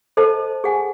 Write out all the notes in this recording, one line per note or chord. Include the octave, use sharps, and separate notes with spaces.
A4 C5 D#5 A5
G#4 F#5 G#5